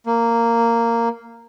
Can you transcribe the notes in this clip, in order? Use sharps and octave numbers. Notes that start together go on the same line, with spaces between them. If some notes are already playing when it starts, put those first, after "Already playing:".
A#3